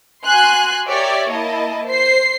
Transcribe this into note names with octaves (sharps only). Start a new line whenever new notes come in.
F#4 G#5 C6 F#6
G4 A#4 C#5 D5 E5
A#3 E4 D#5 A5
C5 C7